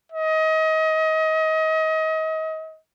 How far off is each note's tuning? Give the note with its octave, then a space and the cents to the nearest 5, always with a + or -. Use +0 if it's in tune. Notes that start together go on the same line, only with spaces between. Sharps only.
D#5 +30